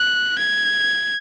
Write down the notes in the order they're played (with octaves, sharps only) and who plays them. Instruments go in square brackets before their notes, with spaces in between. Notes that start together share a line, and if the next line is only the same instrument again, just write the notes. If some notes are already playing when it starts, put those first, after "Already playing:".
Already playing: [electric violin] F#6
G#6